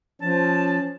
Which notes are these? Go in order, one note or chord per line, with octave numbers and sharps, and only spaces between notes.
F3 C#4 A5